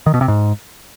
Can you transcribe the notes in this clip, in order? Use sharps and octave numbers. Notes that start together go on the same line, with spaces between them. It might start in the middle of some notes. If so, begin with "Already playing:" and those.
D#3
B2
C3
G#2